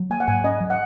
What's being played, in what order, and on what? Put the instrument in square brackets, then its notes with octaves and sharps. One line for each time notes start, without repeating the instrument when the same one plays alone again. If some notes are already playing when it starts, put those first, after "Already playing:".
Already playing: [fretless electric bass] F#3
[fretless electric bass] A#3 [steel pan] G#5
[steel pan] F#5
[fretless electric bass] G#2 [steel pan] G#5
[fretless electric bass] C#4 [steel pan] D#5
[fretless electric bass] F#3
[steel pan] F#5